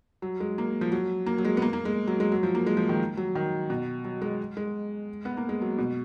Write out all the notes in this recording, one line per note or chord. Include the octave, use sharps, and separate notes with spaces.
F#3
G#3
A#3
F3
F#3
A#3
F#3
G#3
B3
A#3
A#3
G#3
F#3
G#3
F#3
F3
A#3
G#3
F3
D#3
F#3
D#3
B2
F#3
G#3
G#3
B3
A#3
G#3
F#3
B2